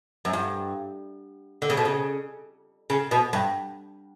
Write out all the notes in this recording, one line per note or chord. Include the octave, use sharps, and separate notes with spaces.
F#2
G2
D3
C#3
B2
C#3
C#3
B2
G2